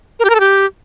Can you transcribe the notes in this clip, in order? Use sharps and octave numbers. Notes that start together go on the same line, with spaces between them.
A#4
G4
A#4
A4
G4